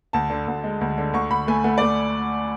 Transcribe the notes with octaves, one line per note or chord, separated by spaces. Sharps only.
D2 A5
D3
D2
G#3
D2
D3
D2 C#6
D2 B5
A3 G#5
A3 F#5
A3 D5